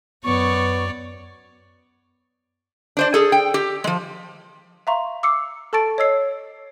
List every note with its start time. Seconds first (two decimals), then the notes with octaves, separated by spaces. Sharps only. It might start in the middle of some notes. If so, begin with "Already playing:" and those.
0.24 F#2 B3 C#5 D5 C#6
2.97 D4 C5 D5
3.14 G#4 A4
3.32 G5
3.54 G4
3.84 F3 G#3
4.87 E5 F5 A#5 C6 C#6
5.23 D6 E6 C7 C#7
5.73 A4 A5 C#6 A6 D7
5.98 C#5 D#5 E6 C7